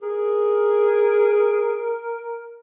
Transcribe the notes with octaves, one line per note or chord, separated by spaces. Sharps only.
G#4 A#4